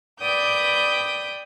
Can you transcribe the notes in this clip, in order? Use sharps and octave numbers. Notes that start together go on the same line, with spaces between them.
B4 D5 G5 D#6 G6